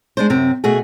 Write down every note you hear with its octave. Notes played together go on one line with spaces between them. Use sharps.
G#3 D4 C5
F#2 C3 C4
B2 A3 F#4 G#4